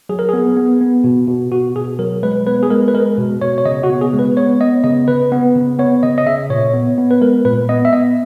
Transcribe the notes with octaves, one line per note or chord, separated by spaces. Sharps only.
F#3 G#4
A#4
B3 G#4
B3
B3
B2
B2
B2 F#4
B2 G#4
F#3 A#4
G#3 B4
B3 B4
G#4
G#3 A#4
B4
G#3 A#4
B2
B2 C#5
C#5
C#3 D#5
F#4
B3
G#4
G#3
B4
B3 C#5
B3 D#5
C#3 D#5
C#3 B4
B3
C#3
B3 C#5
C#3 D#5
D#5
C#3 E5
A#2 C#5
B3
B3
B4
G#3 A#4
A#2 B4
B3 D#5
E5
B3 D#5